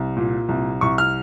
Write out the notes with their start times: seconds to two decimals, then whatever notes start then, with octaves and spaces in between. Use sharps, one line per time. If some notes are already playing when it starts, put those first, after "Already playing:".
Already playing: C2
0.17 A#2
0.49 C2
0.81 C2 C#6
0.98 F6